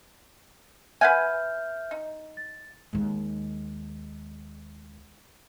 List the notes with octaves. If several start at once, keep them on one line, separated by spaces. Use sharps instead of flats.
B4 E5 F#5 G#5 F6 G6
D#4
A6
D#2 G#3